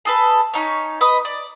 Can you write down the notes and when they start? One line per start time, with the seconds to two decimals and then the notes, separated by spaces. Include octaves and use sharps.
0.05 G#4 A4 B4
0.54 C#4 D#4 C#5
1.01 B4 D#5 D#6
1.25 D5